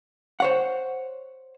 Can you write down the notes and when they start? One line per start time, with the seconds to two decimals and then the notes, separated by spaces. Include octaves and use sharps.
0.40 C5 C#5 F#5